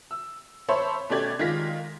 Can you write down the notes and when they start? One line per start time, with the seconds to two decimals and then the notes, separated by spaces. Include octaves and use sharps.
0.11 E6
0.68 C5 C#5 E5 A5 B5 C6
1.09 B2 A3 C#4 G4 D5 G#6
1.39 D#3 G#3 F4 A#6 B6